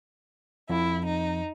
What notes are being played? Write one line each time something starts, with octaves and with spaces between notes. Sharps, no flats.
F2 E4
D#4